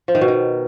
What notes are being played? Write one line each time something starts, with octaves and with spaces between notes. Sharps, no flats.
F3
D#3
B2
D#3